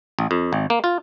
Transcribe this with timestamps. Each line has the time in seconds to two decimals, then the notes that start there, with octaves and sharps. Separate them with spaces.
0.19 A1
0.31 F2
0.53 G#1
0.70 A#3
0.84 F4